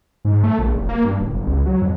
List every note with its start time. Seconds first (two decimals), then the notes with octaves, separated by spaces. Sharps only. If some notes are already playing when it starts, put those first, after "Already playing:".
0.25 G#2
0.44 A3
0.59 A#1
0.75 F1
0.89 A#3
1.05 G2
1.20 D1
1.34 G1
1.47 C#2
1.66 F#3
1.82 F2